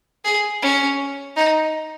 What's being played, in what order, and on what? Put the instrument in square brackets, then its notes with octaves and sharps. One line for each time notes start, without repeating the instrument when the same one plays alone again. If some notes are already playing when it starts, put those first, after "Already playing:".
[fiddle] G#4
C#4
D#4